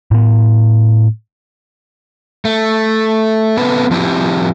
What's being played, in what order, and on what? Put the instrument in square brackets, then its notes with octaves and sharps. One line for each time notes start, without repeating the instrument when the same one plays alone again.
[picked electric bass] A2 B3
[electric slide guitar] A3
B3 C4 A4 B4
F3 C4 E4 G4